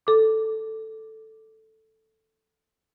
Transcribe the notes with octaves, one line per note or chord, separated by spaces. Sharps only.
A4 D6